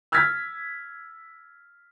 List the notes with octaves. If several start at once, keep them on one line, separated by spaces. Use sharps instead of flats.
E6 F6 G#6 A6 B6